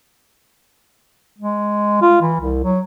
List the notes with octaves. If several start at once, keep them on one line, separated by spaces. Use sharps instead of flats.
G#3
F4
E3
C2
F#3